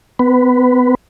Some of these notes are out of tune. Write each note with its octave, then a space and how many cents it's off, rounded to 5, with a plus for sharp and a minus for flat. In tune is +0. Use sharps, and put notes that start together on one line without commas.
B3 +35 B4 +0